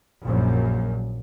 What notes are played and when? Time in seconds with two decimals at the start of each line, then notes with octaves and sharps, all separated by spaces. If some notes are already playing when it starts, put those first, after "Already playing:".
0.23 A#1 F#2